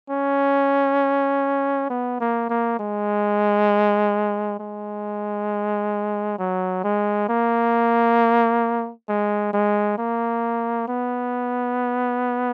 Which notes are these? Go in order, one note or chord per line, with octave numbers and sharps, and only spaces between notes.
C#4
B3
A#3
A#3
G#3
G#3
F#3
G#3
A#3
G#3
G#3
A#3
B3